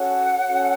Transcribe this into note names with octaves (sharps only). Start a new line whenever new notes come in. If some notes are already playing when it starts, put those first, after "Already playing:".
Already playing: C#4 F#4 A4 C#5 F#5
C#4 F#4 A4 C#5